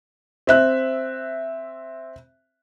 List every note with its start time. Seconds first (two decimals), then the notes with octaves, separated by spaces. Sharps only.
0.47 C4 E5 F#6